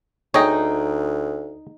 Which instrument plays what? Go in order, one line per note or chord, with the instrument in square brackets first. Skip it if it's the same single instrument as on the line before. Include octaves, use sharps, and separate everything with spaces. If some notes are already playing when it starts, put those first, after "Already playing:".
[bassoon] D2 [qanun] D#4 [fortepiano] G#4 G5 [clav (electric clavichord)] C#5 D#5